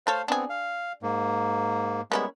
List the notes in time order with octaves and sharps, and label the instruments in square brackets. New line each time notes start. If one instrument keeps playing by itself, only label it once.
[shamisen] A3 A4 C#5 [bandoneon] C5 F5
[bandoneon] B3 C4 [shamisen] D4 G#4
[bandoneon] F5
G#2 A#3
[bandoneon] G3 G#3 B3 [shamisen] A#3 C#4 E4